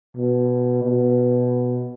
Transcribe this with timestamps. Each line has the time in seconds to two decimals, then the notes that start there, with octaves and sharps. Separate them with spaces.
0.17 B2
0.83 B2